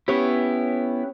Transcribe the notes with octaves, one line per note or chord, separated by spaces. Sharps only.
B3 C#4 E4 G4 C#5